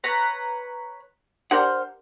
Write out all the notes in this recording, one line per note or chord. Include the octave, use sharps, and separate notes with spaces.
B4 C#5 A#5
D4 G4 A#4 C5 F#5 F6